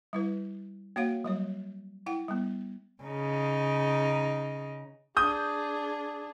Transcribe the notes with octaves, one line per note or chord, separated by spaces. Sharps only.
G3 E4 B4
A#3 F#4 C#5 F5 F#5
F#3 G3 C#5
E4 F#5 G5
G3 B3
C#3 D#4
D4 G#4 D#6 G6